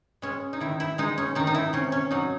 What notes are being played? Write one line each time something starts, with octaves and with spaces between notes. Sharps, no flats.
G#3 C#4
D#4
D#3 E4
E4
G#3 D#4
C#4
D#3 D#4
D#4
E4
C3 C#4
C#4
F#3 D#4